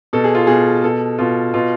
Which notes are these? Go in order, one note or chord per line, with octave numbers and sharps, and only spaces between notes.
B2 A4
G#4
F4
B2 G#4
B2 A4
B2 F4
B2 F4